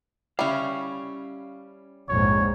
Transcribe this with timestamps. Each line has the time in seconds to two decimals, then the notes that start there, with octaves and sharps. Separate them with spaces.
0.39 G3 C#4 E4 F5
2.09 A#1 F2 G#2 C#5